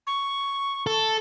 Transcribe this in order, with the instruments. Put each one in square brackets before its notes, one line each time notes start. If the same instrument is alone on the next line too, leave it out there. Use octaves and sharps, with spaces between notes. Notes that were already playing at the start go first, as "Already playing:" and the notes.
[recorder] C#6
[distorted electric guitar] A4